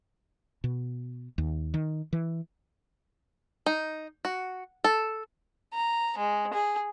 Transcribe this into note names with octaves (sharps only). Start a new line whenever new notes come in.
B2
D#2
D#3
E3
D#4
F#4
A4
A#5
G#3
G#4